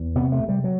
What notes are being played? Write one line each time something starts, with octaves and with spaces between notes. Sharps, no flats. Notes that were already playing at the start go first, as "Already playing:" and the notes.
Already playing: E2
C3 B3
A3
C3
G3
F#3